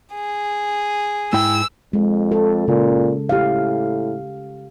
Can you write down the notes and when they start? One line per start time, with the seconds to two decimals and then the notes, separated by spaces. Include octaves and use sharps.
0.13 G#4
1.33 G#2 E4 G5 E6
1.93 F2 G#3
2.31 A4
2.68 A#2 C#3
3.29 A2 G4 F5